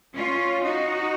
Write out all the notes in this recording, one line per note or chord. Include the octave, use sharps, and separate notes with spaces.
C#4 F4
D#4 F#4